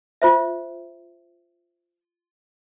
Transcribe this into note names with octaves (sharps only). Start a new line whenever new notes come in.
F4 C5 E5